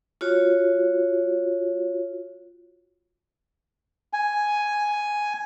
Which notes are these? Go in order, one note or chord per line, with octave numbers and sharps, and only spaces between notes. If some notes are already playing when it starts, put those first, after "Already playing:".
F4 F#4 C#5
G#5